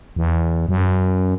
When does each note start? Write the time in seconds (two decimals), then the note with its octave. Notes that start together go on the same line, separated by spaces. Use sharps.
0.16 E2
0.69 F#2